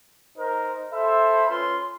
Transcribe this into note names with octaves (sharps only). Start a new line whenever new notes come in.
D#4 A#4 C5
A4 C5 E5 B5
C#4 F4 B4 C6